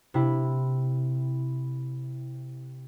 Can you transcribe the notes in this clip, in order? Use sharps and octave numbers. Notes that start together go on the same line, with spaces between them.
C3 E4